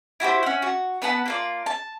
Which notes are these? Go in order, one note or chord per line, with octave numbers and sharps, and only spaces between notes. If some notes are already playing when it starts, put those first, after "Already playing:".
E4 F#4 G4 C5
C#4 F#5
F#4
B3 B4 F#5 A5
A#3 F4 D5
A5